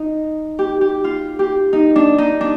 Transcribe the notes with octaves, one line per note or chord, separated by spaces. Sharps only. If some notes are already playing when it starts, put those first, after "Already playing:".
Already playing: D#4
G4
G4
F4
G4
D#4
D4
D#4
D4